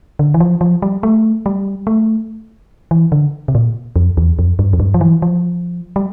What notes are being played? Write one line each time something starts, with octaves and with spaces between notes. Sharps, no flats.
D3
E3
F3
F3
G3
A3
G3
A3
E3
D3
C3
A#2
F2
E2
F2
G2
F2
G2
F3
E3
F3
G3